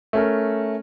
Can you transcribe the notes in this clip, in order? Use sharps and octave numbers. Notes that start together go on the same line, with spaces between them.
A3 C#4 A#4